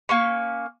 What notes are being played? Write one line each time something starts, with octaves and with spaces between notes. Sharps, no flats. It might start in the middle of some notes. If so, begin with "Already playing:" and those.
A#3 C#4 C#6